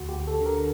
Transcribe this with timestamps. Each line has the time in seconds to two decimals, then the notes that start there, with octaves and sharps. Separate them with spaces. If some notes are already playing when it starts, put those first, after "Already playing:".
Already playing: D2 F#4
0.09 G4
0.16 D2
0.27 A4
0.41 D3 A#4